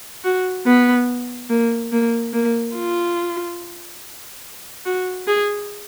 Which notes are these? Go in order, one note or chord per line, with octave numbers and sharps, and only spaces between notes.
F#4
B3
A#3
A#3
A#3
F4
F#4
G#4